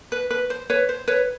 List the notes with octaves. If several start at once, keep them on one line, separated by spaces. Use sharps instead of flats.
B4
B4
C5
B4 C#5
C5
B4 C#5